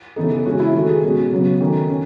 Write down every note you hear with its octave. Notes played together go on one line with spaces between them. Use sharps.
C#3 E3 B3 D#4 A4
A4
C#3 G#3 C#4 F#4
E4
D#3 A3 C#4 F#4
G#4
B2 G#3 C#4 F#4
C#3 F#3 B3
D#3 A3 C#4
C#4